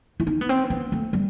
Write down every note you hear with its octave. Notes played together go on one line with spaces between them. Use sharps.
E4
D#4
B3
C4
B3
A3
G3